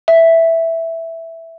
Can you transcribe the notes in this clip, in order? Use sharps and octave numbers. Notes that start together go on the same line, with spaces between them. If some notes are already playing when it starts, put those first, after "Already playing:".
E5